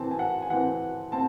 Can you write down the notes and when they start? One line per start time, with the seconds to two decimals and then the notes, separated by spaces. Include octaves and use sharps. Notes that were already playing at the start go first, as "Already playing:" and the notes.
Already playing: E3 C4 A5
0.11 G#5
0.19 F#5
0.42 G#5
0.50 E3 C4 F#5
1.12 C4 A5